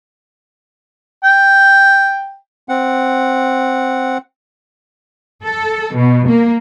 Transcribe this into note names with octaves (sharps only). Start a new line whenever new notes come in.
G5
C4 F#5
A4
B2
A#3